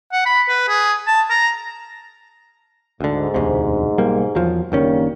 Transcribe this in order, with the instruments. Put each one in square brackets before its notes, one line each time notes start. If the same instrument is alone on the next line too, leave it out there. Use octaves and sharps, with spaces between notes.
[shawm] F#5
B5
B4
G#4
A5
A#5
[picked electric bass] D2 D3 [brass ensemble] G#2
[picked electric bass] E1 D2 C3
B1 G3 A#3
E2 F3 F#3
[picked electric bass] F#1 D#3 C#4 [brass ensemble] D3 G3 A#3